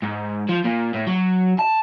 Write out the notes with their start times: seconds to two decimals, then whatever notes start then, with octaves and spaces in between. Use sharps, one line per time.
0.03 G#2
0.49 F3
0.65 A#2
0.94 A2
1.07 F#3
1.59 A5